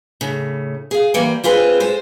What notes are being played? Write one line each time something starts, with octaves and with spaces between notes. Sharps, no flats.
A2 C#3
G#4 F5
E3 G3 A#3
C4 F4 G#4 B4 C5
G#3 A4 C5